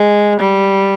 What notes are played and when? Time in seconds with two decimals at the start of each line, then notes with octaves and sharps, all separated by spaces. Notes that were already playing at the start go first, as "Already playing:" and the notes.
Already playing: G#3
0.40 G3